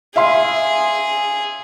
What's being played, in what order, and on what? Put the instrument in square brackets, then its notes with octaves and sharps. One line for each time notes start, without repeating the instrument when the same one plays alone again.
[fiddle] G#4 [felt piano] E5 F5 C6